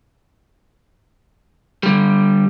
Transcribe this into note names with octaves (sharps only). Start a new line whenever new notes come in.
D3 G3